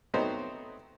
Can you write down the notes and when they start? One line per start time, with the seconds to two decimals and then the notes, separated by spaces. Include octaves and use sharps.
0.14 F#3 A3 B3 C4 D#4 C5